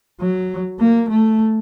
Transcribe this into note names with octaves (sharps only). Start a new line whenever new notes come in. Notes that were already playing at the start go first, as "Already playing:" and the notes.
F#3
A#3
A3